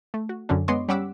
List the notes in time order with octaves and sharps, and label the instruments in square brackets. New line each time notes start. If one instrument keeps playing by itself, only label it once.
[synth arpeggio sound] A3
F#4
F#2 D3 F#3 C#4 D4
G#3 B3 C#5 D#5 C6 D6
G3 C#4 F#5 D6 E6 B6